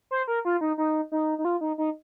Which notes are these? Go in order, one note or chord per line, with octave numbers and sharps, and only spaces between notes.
C5
A#4
F4
D#4
D#4
D#4
D#4
F4
D#4
D#4